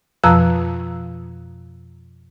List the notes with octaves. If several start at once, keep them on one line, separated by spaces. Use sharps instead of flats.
F2 B2 F3 A#5 E6 F#6